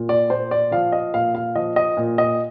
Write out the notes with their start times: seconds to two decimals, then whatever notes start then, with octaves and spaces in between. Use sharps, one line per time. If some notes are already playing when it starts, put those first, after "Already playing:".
Already playing: A#2
0.09 D5
0.30 A#2 C5
0.51 D5
0.71 F3 F5
0.92 D#5
1.14 A#2 F5
1.35 F5
1.55 F3 D#5
1.76 D#5
1.97 A#2
2.18 D#5